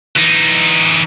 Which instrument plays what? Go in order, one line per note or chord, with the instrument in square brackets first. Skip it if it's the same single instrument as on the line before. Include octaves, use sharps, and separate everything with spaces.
[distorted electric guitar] E3 D#4